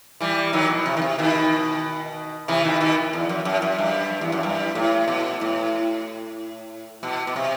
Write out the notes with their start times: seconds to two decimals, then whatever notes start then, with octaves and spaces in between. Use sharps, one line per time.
0.20 E3 G3
0.53 D#3 F#3
0.70 B2
0.86 C3
0.97 D#3
1.02 C3
1.18 B2 D#3
2.48 C3 E3
2.64 B2 D#3
2.81 B2 D#3
3.13 E2
3.29 F#2
3.45 F#2
3.62 F#2
3.78 G2
4.21 E2
4.32 F#2
4.43 G2
4.75 A2
5.08 B2
5.41 A2
7.03 B2
7.27 B2
7.36 C3